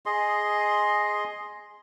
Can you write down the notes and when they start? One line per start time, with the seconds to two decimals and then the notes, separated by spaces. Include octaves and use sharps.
0.06 G#4 D#5 C6